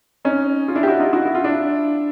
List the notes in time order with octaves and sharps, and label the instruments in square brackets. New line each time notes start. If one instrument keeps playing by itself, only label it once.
[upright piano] C#4 D#4
F4
D4 E4
G4
E4 F#4
D#4 F4
E4 F#4
E4
F4
D4 E4